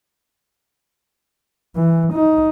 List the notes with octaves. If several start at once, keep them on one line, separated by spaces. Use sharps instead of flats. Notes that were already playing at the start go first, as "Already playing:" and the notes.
E3
D#4